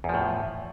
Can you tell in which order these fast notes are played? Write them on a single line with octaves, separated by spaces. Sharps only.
E2 F3 A2